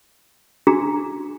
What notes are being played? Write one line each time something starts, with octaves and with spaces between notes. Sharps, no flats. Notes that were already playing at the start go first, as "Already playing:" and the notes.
D4 F#4 G#4 A#5